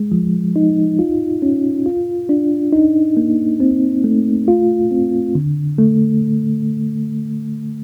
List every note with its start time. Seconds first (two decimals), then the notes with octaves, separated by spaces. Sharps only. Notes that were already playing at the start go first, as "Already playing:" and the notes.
Already playing: G#3
0.12 F3
0.56 D#4
0.99 F4
1.42 C#4
1.86 F4
2.29 D4
2.73 D#4
3.17 A#3
3.60 C4
4.04 A3
4.48 F4
4.91 C4
5.35 D3
5.78 A3